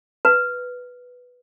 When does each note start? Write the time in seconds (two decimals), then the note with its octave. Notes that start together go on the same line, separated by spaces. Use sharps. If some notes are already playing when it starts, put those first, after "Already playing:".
0.25 B4